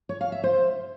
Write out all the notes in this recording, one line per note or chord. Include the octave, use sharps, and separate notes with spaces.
C#5
F5
E5
C5